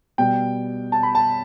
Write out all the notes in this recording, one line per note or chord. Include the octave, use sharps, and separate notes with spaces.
B2 G3 G5
A5
B5
A5